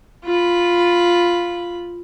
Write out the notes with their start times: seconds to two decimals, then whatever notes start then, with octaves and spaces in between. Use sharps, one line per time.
0.25 F4 B5